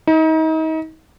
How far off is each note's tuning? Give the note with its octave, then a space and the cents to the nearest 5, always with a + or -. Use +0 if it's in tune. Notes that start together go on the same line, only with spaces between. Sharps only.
D#4 +35